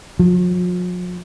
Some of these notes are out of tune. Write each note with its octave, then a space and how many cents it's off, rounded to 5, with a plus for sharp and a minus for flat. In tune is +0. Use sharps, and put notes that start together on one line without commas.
F3 +45